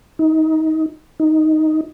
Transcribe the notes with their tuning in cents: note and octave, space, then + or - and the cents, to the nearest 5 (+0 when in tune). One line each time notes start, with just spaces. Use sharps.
D#4 +25
D#4 +5